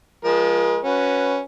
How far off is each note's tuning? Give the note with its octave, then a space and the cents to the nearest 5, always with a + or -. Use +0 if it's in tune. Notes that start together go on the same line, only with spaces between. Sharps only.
F3 +0 G#3 +0 A#4 +40
C#4 +0 F#4 -10 B4 +0